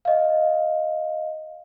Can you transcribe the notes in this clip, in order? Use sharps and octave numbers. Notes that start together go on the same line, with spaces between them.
D#5 F5